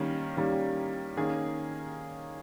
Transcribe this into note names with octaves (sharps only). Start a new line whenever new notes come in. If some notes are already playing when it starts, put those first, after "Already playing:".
Already playing: D#3 G3 A#3 C#4
D#3 G3 A#3 C#4
D#3 A#3 C#4 G#4